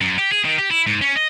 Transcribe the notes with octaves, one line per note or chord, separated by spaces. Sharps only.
F#2
G4
G#4
D#3
G4
E4
G#2
C#4
D#5